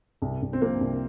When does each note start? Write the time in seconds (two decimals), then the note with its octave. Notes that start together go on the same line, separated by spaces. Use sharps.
0.22 C2
0.42 C2
0.53 C4
0.61 F3 A#3
0.81 C2